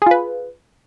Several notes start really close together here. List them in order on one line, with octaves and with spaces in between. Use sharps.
G#4 F4 B4